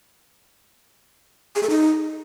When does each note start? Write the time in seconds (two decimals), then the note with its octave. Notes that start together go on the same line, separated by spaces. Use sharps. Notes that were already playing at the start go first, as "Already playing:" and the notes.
1.56 G#4
1.63 A4
1.70 D#4